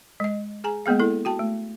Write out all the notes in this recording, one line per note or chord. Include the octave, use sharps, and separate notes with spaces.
G#3 D#5
G#4 G#5 A#5
G#3 A#3 B3 G#4 F5
E4 A4
F#4 G5 A5
A3